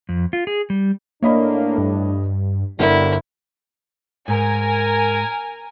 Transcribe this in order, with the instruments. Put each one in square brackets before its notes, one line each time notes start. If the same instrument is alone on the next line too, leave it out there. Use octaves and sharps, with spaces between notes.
[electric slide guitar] F2
F4
G#4
G3
[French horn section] A2 A3 D4 [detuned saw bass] A#3 [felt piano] C#5 D#5 B5
[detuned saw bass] G2
[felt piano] G1 D3 A#4 [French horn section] G3 [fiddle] E4
[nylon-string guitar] G#2 [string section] A#4 G#5